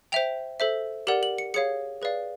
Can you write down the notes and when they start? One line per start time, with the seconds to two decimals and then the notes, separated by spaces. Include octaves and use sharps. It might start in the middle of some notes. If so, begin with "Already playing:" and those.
0.12 C5 E5 G5 F7
0.60 A4 C5 E5
1.07 G4 A#4 D5 F#5 F#7
1.23 F#7
1.38 C#7
1.54 G#4 C#5 F5 C#7
2.02 G#4 B4 D5 F5